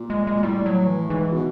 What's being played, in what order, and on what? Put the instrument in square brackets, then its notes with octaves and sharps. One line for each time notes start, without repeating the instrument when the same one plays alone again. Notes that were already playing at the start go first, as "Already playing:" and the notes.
Already playing: [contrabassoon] A#2
[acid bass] G#3
G#3
[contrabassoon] A#2
[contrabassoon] A2 [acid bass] G3
[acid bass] F#3
E3
[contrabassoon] G#2 [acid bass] E3
[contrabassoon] B2